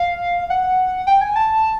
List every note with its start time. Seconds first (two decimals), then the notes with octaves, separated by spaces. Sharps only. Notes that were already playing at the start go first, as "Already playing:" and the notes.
Already playing: F5
0.50 F#5
1.07 G5
1.21 G#5
1.36 A5